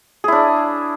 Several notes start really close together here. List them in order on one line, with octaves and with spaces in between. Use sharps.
G#4 E4 D4